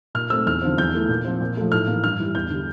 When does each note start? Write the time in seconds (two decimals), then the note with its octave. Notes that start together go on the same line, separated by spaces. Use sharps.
0.15 A#2 F6
0.30 A3 C4 E6
0.46 E2 F6
0.62 D3 F3 C4
0.78 E2 G6
0.94 E3 A3
1.09 A#2
1.25 F3 C4
1.41 A#2
1.57 F3 A3
1.72 A2 F6
1.87 E3 A#3
2.03 G2 F6
2.20 E3 G3
2.35 E2 G6
2.50 D3 G3